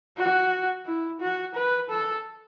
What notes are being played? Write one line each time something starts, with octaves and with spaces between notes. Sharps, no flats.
F#4
E4
F#4
B4
A4